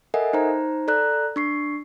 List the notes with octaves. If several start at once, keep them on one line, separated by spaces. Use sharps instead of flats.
A4 A#4 D#5 E5 F#5 G#5
D#4 C5 A#5
A4 D5 A#5 F#6
D4 C#6 C7